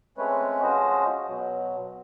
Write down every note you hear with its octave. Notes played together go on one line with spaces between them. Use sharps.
G#3 A3 C4 C#4 B4 C#5
F3 G#3 C#4 F#4 C5 D#5
B2 F#3